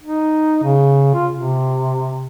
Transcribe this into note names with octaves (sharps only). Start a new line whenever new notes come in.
D#4
C#3
F4
C3